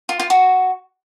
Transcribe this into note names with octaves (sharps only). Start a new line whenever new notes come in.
F4
F4
F#4